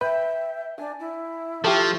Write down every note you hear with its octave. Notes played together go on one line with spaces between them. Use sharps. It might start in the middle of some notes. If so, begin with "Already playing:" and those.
B4 E5 G5
D4 G#5
E4
F3 A3 G4 A4